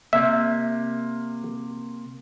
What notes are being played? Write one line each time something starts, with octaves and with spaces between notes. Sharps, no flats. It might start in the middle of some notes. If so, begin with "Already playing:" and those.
C3 A#3 E5